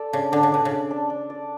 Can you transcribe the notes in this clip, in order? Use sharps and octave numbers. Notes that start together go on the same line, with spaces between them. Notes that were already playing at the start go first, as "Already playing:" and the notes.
Already playing: A4 D5
C#3 D4
D3 D4
C#3
B2 D5
C#3
A4
D4
D4
D5